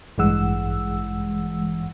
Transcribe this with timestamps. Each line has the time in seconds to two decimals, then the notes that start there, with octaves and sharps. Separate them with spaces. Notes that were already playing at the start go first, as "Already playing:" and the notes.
0.18 A1 G2 E3 G#3 F#5 E6